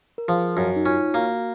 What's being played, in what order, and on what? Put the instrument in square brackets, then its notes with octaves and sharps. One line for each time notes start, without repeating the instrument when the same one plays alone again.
[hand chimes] A#4
[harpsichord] F3 [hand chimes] G#4
[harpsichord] F#2 [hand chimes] F#4
[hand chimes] D#4
[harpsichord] C#4 [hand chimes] F4
[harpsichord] A#3 [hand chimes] F#4